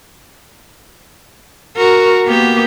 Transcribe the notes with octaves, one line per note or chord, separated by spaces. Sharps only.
F#4 A#4
A#3 B3 G4